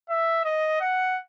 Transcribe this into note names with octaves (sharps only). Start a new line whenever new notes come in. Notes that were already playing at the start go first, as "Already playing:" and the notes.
E5
D#5
F#5